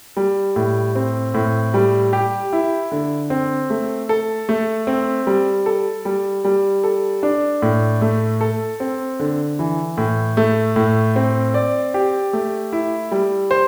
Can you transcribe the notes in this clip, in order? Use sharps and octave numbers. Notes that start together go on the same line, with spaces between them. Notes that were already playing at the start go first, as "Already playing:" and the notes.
G3
A2
C4
A2
G3
G4
E4
D3
C4
A3
A4
A3
C4
G3
A4
G3
G3
A4
D4
A2
A3
A4
C4
D3
E3
A2
A3
A2
C4
D5
G4
A3
E4
G3
C5